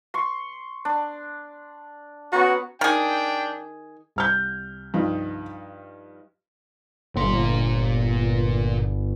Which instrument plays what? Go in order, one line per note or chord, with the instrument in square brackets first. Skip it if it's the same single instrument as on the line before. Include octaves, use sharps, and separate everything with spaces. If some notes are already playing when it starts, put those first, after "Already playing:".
[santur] C6 C#6
D4
[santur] B3 C#4 A#5 [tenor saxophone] F#4
[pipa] D#3 G#4 [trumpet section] D4 G5
[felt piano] C2 F6 G6
[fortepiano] G2 F3 D#4
[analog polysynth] G1 [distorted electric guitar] A#2 C6